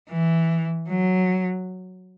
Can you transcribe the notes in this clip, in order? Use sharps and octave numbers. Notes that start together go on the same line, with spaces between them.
E3
F#3